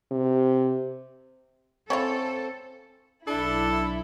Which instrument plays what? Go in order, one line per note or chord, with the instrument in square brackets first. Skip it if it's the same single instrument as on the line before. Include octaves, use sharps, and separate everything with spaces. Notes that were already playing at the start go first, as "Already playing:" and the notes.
[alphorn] C3
[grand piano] C4 [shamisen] C#4 E4 F4 [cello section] A4
[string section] B1 E4 [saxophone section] D4 [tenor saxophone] A4